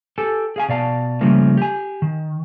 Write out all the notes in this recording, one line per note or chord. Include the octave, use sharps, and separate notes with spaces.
G4 A4 G#5
G#4 F5 G#5
B2 D5 F5 A5
C#3 F3 G3 A3 A#3
G4 G#5
D#3